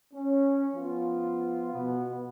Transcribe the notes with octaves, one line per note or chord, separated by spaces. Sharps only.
C#4
F3 B3 F4
B2 B3